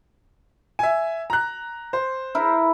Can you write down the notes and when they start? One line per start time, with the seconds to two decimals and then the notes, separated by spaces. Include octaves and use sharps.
0.79 E5 G#5
1.30 A#5 F#6
1.93 C5
2.35 E4 A#4 B4